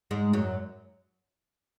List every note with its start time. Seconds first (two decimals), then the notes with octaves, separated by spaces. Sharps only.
0.11 G#2 G#3
0.33 F#2 F#3